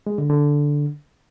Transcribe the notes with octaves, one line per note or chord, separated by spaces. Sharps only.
G#3
D3
D3